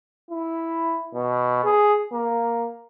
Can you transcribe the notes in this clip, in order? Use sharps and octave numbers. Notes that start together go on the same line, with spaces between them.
E4
B2
G#4
A#3